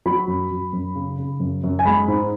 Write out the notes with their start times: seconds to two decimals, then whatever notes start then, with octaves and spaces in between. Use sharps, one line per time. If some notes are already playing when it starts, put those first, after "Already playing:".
0.06 F#3 B5
0.28 F#2
0.51 F#2
0.73 F#2
0.95 C#3
1.19 C#3
1.40 F#2
1.63 F#2
1.79 G#5
1.85 G#3 B5
2.08 G#2